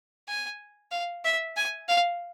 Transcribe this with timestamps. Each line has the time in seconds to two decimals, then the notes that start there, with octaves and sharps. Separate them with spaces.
0.28 G#5
0.92 F5
1.25 E5
1.57 G#5
1.89 F5